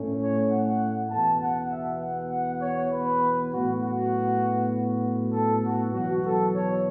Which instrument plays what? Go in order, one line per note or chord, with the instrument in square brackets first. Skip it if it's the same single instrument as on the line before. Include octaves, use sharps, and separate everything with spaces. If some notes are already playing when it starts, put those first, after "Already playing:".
Already playing: [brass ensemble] A2 A3 C#4
C#5
F#5
E2 B2 B3 A5
F#5
E5
F#5
F#5
C#5
B4
A2 F#3 B3 F#4
F#4
A4
F#4
E2 B2 F#3 F#4
A4
C#5